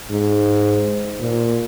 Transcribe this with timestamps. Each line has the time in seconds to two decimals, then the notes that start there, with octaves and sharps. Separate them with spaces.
0.11 G#2
1.20 A#2